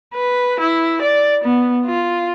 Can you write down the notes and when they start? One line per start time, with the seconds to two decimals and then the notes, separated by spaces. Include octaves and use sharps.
0.15 B4
0.60 E4
1.02 D5
1.44 B3
1.86 F4